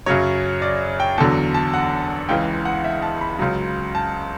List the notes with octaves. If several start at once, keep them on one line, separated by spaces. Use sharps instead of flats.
F#2 C#3 F#3 C#5
D5
G5
E2 D3 F#3 A5
A5
F#5
C#2 C#3 E3 G5
F#5
E5
A5
B5
C#2 C#3 F#3
A5